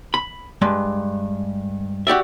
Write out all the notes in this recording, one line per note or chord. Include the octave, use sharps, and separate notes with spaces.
B5
G2 G#3 A5
F#4 G4 D5 E5